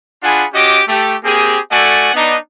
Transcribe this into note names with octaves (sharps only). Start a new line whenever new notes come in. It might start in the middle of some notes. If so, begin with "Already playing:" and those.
D4 F4 G#4 F#5 G#5 B5
C#4 F#4 G4 D#5 D6
A3 G4
A#3 C4 G4 G#4
A3 F#4 A4 D5 F#5 G#5
B3 D4 D#4